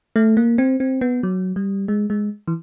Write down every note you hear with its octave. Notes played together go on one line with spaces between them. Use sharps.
A3
A#3
C4
C4
B3
F#3
G3
G#3
G#3
E3